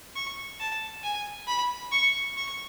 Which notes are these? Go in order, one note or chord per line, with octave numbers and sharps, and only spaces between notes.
C#6
A5
G#5
B5
C#6
C#6